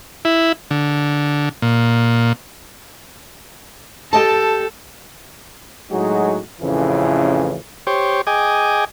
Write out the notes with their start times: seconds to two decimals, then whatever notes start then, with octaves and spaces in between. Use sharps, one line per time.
0.25 E4
0.71 D3
1.62 A#2
4.13 G4 A4 D#5 A5
5.92 A2 F#3 G#3 D#4 F#4 G#4
6.61 A1 F2 C#3 E3
7.87 G4 C5 C#5
8.27 G#4 D#5 G5 G#5 D6